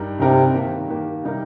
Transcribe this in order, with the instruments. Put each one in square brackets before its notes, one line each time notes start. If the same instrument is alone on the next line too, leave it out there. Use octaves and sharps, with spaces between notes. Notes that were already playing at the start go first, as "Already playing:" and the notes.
Already playing: [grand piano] G2 G3 D#4 A#4
[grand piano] G2 G3 D#4 A#4 [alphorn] C3
[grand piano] D#3 A#3 G4
D#3 A#3 G4
C3 G3 D#4 A#4